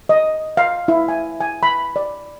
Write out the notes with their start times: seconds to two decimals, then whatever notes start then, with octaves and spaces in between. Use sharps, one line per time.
0.09 D#5
0.57 F5
0.88 E4
1.08 G#5
1.41 G#5
1.63 B5
1.96 D5